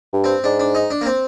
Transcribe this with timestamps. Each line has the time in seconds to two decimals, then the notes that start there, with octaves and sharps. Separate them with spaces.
0.13 G2
0.24 C4
0.44 G#2 D4
0.59 D4
0.75 D#4
0.91 D4
1.01 A#3
1.06 C4